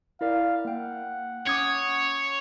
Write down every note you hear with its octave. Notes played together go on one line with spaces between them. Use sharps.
E4 A#4 D5 F5
A#3 F#5 G5
C#4 C#5 D6 D#6 G#6